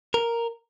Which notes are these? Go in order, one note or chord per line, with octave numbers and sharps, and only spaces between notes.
A#4